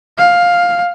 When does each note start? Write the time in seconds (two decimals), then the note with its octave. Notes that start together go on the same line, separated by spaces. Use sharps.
0.18 F5